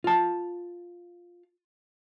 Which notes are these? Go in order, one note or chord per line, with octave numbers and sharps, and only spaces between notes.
F4 A5